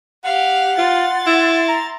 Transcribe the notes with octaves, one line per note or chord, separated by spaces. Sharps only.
G4 F5 F#5
F4 C6 A6
E4
A#5